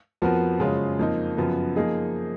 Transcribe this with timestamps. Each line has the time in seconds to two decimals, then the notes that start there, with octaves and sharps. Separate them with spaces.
0.22 F2 F3 B3 F#4 A#4
0.60 F#2 C#3 G#3 C#4 F4
0.99 F2 F3 A#3 D#4
1.37 F#2 C#3 F3 B3
1.76 F3 A#3 D#4 G#4